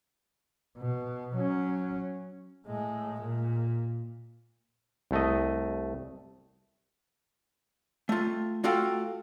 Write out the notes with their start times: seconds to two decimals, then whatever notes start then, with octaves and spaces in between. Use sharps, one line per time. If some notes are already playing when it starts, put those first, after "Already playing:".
0.78 B2
1.36 F#3 C#4
2.67 A2 G#3
3.21 A#2
5.11 C2 A3 D#5
8.09 A3 F4
8.64 A3 F4 F#4 A4 F5 G5